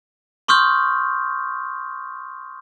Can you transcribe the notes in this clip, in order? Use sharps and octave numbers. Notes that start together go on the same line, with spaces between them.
C6 C#6 D#6 F6 G6